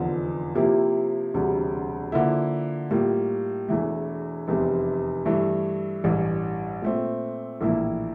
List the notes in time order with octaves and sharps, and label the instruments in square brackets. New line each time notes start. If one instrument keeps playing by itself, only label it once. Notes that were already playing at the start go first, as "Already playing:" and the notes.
Already playing: [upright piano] F1 E2 D3 F3
C3 F3 A#3 E4 G4
E1 D2 C3 G3
D3 F3 A#3 E4
A2 G3 A#3 F4
E1 E2 E3 A3
F1 E2 C3
G2 E3 A3
A1 G2 E3
A#2 A3 C4
A#1 A2 E3 A#3 E4